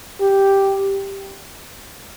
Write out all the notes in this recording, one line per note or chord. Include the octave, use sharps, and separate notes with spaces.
G4